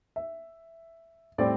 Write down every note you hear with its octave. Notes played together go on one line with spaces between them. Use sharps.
E5
A2 G3 C4 D5